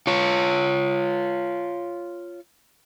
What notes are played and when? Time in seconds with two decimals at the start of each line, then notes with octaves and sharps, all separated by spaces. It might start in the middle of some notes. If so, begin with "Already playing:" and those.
0.07 F4 C#5